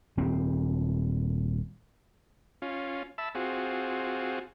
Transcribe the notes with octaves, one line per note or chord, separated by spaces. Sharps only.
D#1 C4
C#4 F4
E5 A5 B5 E6
C4 F4 F#4 G#4